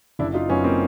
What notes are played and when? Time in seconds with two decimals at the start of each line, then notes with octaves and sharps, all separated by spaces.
0.19 F#1 D4 E4
0.34 D#4 F4
0.49 F#2 B3 C#4
0.64 A#3 C4